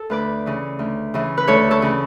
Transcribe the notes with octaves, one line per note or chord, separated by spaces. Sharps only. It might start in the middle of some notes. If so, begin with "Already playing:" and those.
Already playing: A4
D2 B4 D5
C#3 E3
D2
C#3 E3
B4
D2 A4 C#5
A4 C#5
C#3 E3